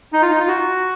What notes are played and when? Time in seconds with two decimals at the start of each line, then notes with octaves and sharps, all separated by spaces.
0.13 D#4
0.22 F4
0.30 D#4
0.40 F4
0.48 F#4